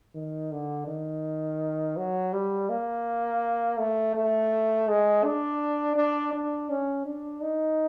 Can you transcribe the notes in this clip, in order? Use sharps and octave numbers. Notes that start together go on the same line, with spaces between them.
D#3
D3
D#3
F#3
G3
A#3
A3
A3
G#3
D4
D4
D4
C#4
D4
D#4